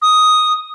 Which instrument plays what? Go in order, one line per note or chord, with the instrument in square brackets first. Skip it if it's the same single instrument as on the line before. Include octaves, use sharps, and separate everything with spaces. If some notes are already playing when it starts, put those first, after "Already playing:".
[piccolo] D#6